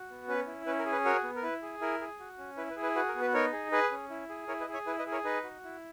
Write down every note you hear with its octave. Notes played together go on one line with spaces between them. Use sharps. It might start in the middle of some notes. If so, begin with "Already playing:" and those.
Already playing: F#4
B3
C#4 B4
E4
C#4 B4
A#4
G#4
B4
F#4 A#4 C#5
B3
A#4
E4 B4
G#4
E4 A#4
G#4
F#4
C#4
E4 B4
B4
G#4
B4
F#4 B4
A#4
B3
B4
D#4 A#4 C#5
G#4
G#4 B4
C#4
E4
G#4
E4 A#4 C#5
B4 D#5
G#4
C#5 E5
E4 B4
B4 D#5
G#4
A#4 C#5
D#4 B4
F#4
E4